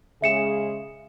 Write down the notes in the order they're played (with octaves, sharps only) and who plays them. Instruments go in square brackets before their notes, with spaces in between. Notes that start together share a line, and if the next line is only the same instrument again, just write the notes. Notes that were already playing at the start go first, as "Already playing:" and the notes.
[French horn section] C#3 G#3 G#4 [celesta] E5 C#7 E7